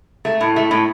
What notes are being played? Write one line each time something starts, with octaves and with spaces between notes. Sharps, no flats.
A3
A2
A3
A2